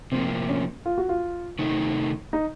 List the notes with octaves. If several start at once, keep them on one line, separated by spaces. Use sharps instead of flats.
C3 F3 A#3 C4
C#4
F4
F#4
F4
C3 D#3 A3 D#4
D#4